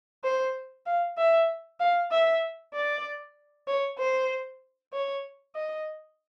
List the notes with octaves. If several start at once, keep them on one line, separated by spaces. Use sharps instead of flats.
C5
F5
E5
F5
E5
D5
C#5
C5
C#5
D#5